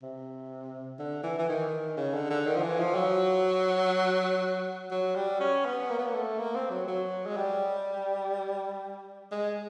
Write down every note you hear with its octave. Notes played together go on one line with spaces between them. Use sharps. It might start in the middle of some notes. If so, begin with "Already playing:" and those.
C3
D3
E3
E3
D#3
C#3
D3
D3
D#3
F3
E3
F3
F#3
F#3
G3
C#4
B3
A#3
B3
A#3
A3
A#3
C4
F#3
F#3
G#3
G3
G#3